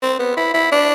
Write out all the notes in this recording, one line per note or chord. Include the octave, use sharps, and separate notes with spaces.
C4
B3
E4
E4
D4